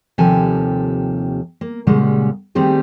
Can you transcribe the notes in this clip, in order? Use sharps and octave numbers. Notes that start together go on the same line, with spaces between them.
D#2 C3 F3 G4 A4 G#5
A#3
A#2 C#3 G3 G#3 F#5
D#3 G3 A3 C4 G4 G#4